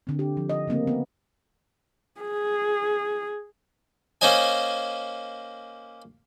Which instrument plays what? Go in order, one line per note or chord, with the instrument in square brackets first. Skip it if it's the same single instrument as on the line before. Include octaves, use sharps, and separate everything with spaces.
[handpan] D3 C4
G4
F3
D#5
C#3 A3 A#3 C4
B3
[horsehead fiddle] G#4
[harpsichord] A#3 C#4 C5 C#5 D#5 G#5